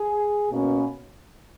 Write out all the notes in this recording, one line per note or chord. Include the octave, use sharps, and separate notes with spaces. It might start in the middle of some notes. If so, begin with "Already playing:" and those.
Already playing: G#4
B2 A#3 C#4